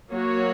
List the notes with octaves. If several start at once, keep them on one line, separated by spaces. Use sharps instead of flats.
F#3 A#3 F#4 C#5